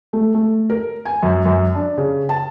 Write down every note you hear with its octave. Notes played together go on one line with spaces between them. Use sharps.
A3
A3
A#4
G#5
F#2
F#2
D4
C#3
A5